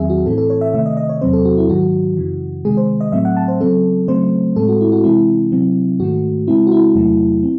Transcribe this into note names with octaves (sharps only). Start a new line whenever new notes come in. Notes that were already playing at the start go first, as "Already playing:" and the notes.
Already playing: E2 D#3 F#3 C4 G#4 E5
F#4
A2 E3 C4 A4
A4
C#5
E5
C3 D#3 A3 E5
D#5
D#5
C#5
E2 C3 F#3 C4 C5
A4
F#4
E4
G#2 D#3 F#3 F#4
F#2 C#3 E3
C3 D#3 G#3 G#4
C5
D#5
A2 F#3 A3 C4 E5
F#5
A5
C5
C#3 F#3 C4 A4
C#3 F#3 A3 C4 C5
A2 G#3 C4 A4
F#4
E4
F#4
C3 E3 G#3 C4 E4
C3 F#3 C4
G#2 D#3 A3 F#4
C#3 G#3 C4 E4
F#4
E4
E2 C3 F#3 A3
C4